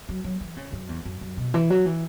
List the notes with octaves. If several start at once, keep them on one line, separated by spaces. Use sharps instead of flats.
F#3
F#3
E3
C#3
F#2
E2
F#2
F#2
B2
E3
F#3
E3